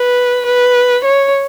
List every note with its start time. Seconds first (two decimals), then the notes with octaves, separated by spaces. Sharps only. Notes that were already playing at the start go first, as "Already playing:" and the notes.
Already playing: B4
0.46 B4
1.05 C#5